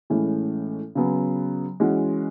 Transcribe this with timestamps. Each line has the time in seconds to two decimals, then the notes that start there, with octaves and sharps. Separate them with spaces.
0.10 A2 E3 G#3 C#4
0.95 C#3 F#3 B3
1.80 E3 G#3 C#4 F#4